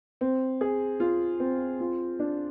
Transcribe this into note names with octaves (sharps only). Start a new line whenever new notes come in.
C4
G#4
F4
C4
F4
D4